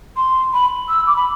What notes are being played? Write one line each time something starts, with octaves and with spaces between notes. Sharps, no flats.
C6
B5
E6
D6
B5